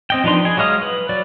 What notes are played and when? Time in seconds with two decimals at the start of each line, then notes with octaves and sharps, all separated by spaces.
0.10 C4 D#5 G5
0.24 F3 D4 D#4 B4 C6
0.45 G#4
0.57 F#3 G#3 D#5 F5 D#6
0.82 B4
1.09 F#3 D5